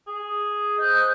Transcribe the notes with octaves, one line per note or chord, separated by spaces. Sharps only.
G#4
C5 D#5 F#6 G6